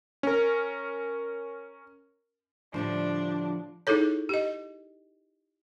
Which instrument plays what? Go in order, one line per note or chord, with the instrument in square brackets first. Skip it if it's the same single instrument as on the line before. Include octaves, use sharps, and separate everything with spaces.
[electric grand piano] C#4 A#4
[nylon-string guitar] A2 D3 G3 [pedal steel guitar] F3 [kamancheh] D4
[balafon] D#4 E4 G#4 A4 C#5
G4 D#5